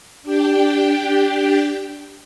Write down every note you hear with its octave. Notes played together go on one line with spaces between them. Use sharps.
D4 G4 G5